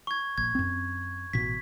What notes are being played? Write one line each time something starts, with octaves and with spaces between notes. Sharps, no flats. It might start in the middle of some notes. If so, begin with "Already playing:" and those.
C#6 G#6
A#1 G#6
F#2 C4
A1 B2 B6